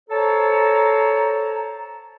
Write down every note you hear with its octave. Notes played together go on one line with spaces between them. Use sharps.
A4 C5 C#5 A5 A#5